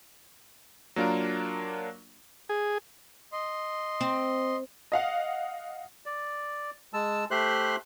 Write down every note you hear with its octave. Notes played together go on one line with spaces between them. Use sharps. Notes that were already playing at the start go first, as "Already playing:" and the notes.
F#3 A#3 D4 F4 A#4
G#4
D#5 C6
C4
D#5 F5 F#5
D5
G#3 A5 E6
A3 G4 C5 E5 C6 F#6